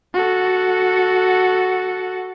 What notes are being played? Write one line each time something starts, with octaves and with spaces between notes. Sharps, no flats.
F#4 A4